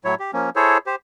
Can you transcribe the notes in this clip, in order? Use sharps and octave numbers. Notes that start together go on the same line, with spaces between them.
A2 F#3 E4 C#5
G4
F3 A#3 C#4
E4 G#4 A4 C5 C#5
G4 C5